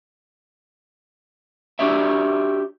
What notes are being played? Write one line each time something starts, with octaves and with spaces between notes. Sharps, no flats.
D4 F#4 G4 C#5 D5 E5